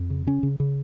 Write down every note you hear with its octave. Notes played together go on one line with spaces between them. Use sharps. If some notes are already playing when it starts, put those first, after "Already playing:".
Already playing: F2
C#3
C#3 C#4
C#3
C#3